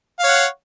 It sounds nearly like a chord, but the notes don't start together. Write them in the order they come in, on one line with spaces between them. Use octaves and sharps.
F5 C#5 F#5